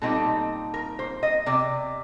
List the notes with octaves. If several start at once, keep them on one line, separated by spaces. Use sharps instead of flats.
A#2 G3 C4 D#4 A4
A#4
C5
D#5
C3 D5